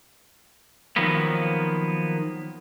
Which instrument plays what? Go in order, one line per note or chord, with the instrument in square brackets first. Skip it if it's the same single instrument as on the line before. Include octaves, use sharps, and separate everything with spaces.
[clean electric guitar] D#3 F3 F#3 A#3 B3